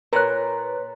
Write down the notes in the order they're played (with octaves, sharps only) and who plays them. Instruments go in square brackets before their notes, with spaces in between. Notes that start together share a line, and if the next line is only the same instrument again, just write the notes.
[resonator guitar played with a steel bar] A#2 [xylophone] A#4 F#6 [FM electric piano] B4 C#5 [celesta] A#5